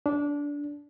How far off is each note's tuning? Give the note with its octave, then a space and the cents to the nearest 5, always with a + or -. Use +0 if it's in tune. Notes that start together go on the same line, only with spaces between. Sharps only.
D4 -20